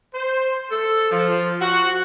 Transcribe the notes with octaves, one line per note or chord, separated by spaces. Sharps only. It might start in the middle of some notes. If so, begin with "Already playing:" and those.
C5
A4
F3
F#4